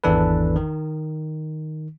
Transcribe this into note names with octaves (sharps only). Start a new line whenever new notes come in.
G#1 E2 E3 D4 A4 B4
D#3